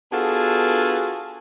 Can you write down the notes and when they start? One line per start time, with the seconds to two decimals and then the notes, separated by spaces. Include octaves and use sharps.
0.12 B3 D4 F4 F#4 G#4 A4